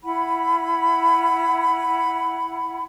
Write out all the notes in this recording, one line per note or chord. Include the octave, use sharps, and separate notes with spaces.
E4 F#5 B5